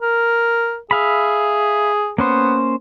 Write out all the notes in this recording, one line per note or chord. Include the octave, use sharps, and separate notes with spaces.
A#4
G#4 E5 F5 B5
A#3 B3 C#4 C5